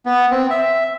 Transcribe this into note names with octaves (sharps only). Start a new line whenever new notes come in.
B3
C4
E5